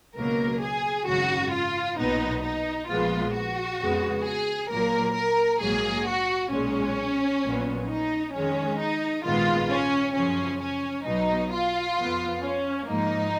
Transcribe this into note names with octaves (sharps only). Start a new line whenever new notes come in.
C#2 B2 F#3 A#3 A#4
G#4
G#1 F#2 C#3 F#4
F4
B1 A#2 F#3 B3 D#4
D#4
A#1 A#2 F3 G#3 B3 F4
F#4
F2 C#3 G#3 B3
G#4
A#1 A#2 F#3 A#3 A#4
A#4
A#1 G#2 F#3 A#3 G#4
F#4
B1 A#2 G#3 C#4
A#1 A#2 F#3 B3
D#4
F2 D#3 G#3 C#4
D#4
A#1 G#2 D#3 G#3 B3 F4
C#4
F#2 C#3 F3 C#4
C#4
B1 B2 F#3 D#4
F4
F2 F3 B3
C#4
G#2 F3 A#3 D#4